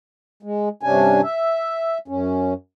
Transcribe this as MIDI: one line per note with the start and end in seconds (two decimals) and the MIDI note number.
0.43 0.69 56
0.83 1.21 43
0.83 1.21 48
0.83 1.21 61
0.83 1.21 62
0.83 1.21 80
1.23 1.98 76
2.08 2.54 42
2.08 2.54 61